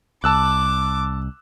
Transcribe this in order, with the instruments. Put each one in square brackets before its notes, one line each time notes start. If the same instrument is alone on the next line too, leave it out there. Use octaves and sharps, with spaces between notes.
[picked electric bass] C2 [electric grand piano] A5 E6 F#6 [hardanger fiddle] D6